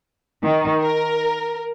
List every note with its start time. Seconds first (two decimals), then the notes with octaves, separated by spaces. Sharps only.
0.43 D#3
0.82 A#4